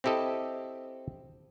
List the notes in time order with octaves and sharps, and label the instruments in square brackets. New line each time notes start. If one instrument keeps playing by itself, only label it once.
[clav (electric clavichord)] C4 E4 G4 A4 D#5